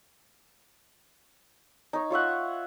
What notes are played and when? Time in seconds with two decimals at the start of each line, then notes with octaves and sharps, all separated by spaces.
1.93 D#4 C#5
2.10 F4 C#5 E5 F#5